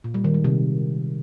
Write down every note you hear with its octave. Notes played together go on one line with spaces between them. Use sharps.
A#2
G3
D#3
G#3
C3